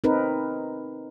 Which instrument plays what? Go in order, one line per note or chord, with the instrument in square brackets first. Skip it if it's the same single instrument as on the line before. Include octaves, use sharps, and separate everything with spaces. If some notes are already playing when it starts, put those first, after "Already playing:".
[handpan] C4 D#4 A#4 B4